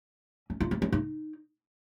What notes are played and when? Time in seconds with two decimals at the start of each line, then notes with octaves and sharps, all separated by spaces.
0.50 C#4
0.60 F4
0.71 C4
0.82 C#4
0.92 D#4